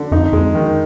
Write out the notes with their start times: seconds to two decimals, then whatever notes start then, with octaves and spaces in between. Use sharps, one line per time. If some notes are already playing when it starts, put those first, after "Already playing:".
Already playing: D3
0.12 F2 D#4
0.33 F2 G#3
0.55 D#3